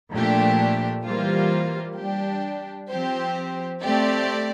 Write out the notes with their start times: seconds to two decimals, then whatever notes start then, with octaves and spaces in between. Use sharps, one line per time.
0.12 A#2 F3 A3 D4 G4
1.05 E3 G3 A#3 F4 C5
1.97 G3 D4 G4
2.89 F3 C4 G4 C5
3.81 A3 C4 G4 D5